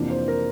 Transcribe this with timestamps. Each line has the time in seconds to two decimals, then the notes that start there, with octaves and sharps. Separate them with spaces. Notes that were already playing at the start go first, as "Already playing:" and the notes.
Already playing: F2 C3 E3 A#3 D4
0.10 C5
0.28 A#4